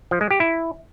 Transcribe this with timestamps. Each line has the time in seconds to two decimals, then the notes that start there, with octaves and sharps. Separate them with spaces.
0.11 F3
0.21 G#3
0.31 G4
0.40 E4